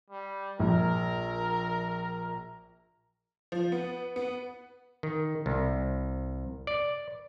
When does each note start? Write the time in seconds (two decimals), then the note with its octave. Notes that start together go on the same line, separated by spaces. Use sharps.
0.10 G3
0.59 A#1 A#4
3.52 F3
3.72 B3
4.16 B3
5.03 D#3
5.46 C2
6.67 D5